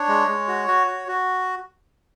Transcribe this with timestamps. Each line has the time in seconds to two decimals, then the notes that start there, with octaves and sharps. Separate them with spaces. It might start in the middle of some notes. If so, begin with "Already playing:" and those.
Already playing: D4 C#5
0.09 G#3
0.28 G#3
0.48 F#4
0.68 F#4
0.87 F#4
1.08 F#4